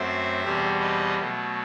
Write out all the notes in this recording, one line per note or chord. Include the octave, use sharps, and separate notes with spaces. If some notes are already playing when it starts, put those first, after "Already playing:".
Already playing: F#2 F#3 A3 C4 C5 E5
E2 B2 G3 C4
B4 D#5
B2 F#3 A3